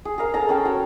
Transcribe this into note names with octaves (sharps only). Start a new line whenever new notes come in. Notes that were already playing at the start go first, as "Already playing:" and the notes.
G#4
G#4 A#4 F5
G#4 A4 F5 A#5
C#4 F5 G5 A5
F#4 C#5